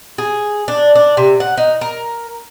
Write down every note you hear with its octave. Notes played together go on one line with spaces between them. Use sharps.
G#4
D4
D4
C3
F#5
D#4
A#4